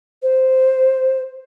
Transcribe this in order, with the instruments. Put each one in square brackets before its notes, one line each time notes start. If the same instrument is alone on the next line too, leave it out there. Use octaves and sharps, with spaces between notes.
[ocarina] C5